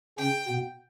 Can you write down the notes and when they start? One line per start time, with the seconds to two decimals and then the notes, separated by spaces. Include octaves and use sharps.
0.18 C#3 C#4 G5
0.47 B2 B3